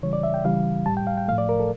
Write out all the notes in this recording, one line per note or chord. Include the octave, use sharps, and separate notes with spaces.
C#3 E3 G3 C#5
D5
E5
G5
C#3 E3 G3 F5
A2 G3 A5
G5
F5
G5
A2 F3 A3 F5
D5
A#4
A4